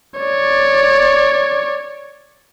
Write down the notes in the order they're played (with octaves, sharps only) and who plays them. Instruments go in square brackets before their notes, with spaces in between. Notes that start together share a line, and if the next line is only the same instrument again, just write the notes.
[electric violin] C#5 D5